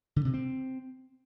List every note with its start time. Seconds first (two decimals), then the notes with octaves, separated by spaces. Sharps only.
0.16 D3
0.25 C3
0.34 C4